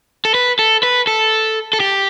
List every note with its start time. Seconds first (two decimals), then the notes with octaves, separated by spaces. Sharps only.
0.25 A4
0.35 B4
0.59 A4
0.83 B4
1.07 A4
1.73 A4
1.80 G4